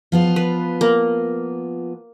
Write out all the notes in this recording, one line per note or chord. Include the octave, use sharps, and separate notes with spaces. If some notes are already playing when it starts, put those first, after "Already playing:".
F3 B3 F4
B4
A#3